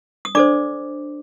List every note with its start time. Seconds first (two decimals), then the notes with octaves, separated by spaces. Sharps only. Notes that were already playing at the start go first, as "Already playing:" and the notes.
0.25 D#6
0.35 D4 A4 C5 D5 D6